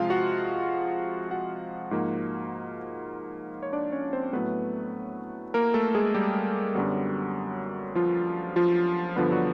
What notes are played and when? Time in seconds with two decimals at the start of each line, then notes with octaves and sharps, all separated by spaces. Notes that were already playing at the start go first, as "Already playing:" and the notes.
Already playing: C3 F3 G#3 F4 F5
0.10 F#4 F#5
1.31 F#4 F#5
1.91 G#2 F3 A#3
3.63 C#5
3.73 D4 D5
3.92 C#4 C#5
4.13 C4 C5
4.33 A2 F#3 A3 B3 B4
5.54 A#3 A#4
5.74 A3 A4
5.95 G#3 G#4
6.14 G3 G4
6.75 F#2 D3 F#3 G3 B3 F#4
7.95 F3 F4
8.56 F3 F4
9.16 G2 D3 F3 B3 B4
9.31 F#3 F#4